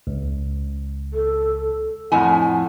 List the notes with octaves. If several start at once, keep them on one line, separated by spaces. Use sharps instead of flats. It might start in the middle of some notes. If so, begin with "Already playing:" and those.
C#2
A4
F2 A2 F#5 G#5